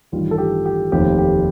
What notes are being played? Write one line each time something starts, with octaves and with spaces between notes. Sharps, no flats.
A1 G2 D#3 G3 F4
A4
G4
G4
F1 D#2 D#3 A3 C4 G4
G4